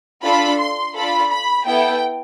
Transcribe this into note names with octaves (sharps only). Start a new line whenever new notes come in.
D4 F4 A4 B5
C6
D4 F4 A4 B5
B5
B3 E4 A4 G5